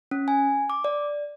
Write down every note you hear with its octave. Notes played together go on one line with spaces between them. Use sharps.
C#4
G#5
D6
D5